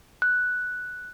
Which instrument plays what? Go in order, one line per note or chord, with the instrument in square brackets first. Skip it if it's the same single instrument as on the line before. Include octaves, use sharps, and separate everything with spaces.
[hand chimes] F#6